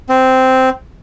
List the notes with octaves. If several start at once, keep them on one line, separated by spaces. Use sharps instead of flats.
C4